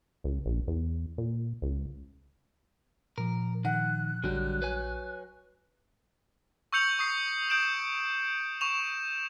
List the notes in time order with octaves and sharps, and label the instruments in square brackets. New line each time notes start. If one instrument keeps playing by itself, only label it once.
[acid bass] C#2
A#1
E2
A#2
C#2
[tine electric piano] A#2 F3 [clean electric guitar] A#4
[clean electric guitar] D#3 [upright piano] F#5 [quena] F#6
[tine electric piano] A#1 [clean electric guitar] D3 G3 [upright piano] F#3
[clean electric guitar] B4 C#5 G#5
[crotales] C#6 E6 G6 C#7 F7 F#7
C#6 D#6 G6 C7
D#6 G6 D7 E7 F#7
C#6 E7 F7